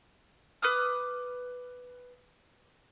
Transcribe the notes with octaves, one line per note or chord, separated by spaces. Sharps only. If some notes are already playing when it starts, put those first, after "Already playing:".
B4 D6 D#6 F6